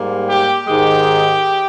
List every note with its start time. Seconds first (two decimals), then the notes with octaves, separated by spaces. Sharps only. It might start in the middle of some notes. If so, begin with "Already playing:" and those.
Already playing: G#2 G3 A#3
0.26 G4
0.66 G#2 D#3 G#3 G4